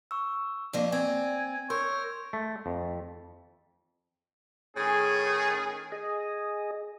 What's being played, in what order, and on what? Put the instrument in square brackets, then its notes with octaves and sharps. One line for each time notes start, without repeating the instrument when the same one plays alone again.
[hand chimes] C#6 E6
[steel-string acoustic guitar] F2 F3 A#3 [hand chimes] D5
[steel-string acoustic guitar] C4 [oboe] G#5
[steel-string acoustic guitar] A#4 [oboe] C#5 [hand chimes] C6 E6 G6
[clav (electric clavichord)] A3
F2
[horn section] A2 D#3 C#4 G#4
[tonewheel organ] G#4 D#5